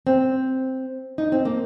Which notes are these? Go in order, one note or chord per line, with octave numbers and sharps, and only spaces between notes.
C4
D#4
C4
A#3